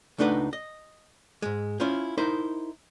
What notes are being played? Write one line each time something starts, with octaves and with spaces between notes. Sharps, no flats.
C#2 A3 D4 D#4 B4 F#5
D#5
G#2 G#3
C#4 E4 F4 C5
D#4 E4 A#4 C5